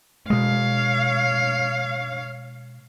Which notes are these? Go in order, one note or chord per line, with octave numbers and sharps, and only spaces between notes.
B2 G#3 C#5 F5